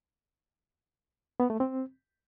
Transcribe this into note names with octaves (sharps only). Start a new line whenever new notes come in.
B3
A3
C4